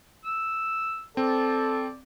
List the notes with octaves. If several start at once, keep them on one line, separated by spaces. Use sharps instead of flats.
E6
C4 A4 D5